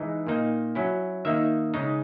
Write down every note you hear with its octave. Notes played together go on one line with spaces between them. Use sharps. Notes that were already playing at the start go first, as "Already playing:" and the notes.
Already playing: E3 G#3 D#4
A#2 A#3 D#4
F#3 C#4 E4
D#3 A#3 D#4 E5
C#3 G#3 D#4